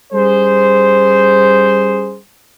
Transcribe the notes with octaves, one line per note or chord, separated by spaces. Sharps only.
G3 C#4 G#4 C5